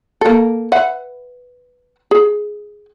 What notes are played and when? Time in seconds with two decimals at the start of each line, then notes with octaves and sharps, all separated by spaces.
0.21 A#3 A4
0.72 B4 E5 F#5
2.11 G#4